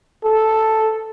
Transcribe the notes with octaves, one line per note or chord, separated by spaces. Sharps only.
A4